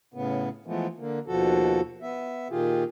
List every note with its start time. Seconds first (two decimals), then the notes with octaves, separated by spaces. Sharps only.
0.14 A2 C#3 B3
0.66 E3 F3 G#3 A3 B3
0.98 D3 A#3
1.27 D#2 B2 F3 F#4 A4
2.02 B3 E5
2.50 A#2 D#3 F4 G4 G#4